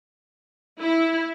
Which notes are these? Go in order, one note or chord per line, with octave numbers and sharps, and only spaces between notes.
E4